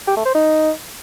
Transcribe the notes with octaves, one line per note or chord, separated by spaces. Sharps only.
G4
A3
C5
D#4